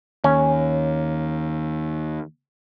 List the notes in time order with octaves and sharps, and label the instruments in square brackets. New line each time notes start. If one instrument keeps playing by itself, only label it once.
[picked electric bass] D#2 [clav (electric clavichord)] C#4